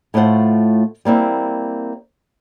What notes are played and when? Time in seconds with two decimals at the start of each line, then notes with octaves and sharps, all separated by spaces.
0.14 A2 A3 F4 C5 F#5
1.05 G3 A#3 C4 E4